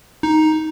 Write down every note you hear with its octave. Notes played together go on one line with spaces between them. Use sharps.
D#4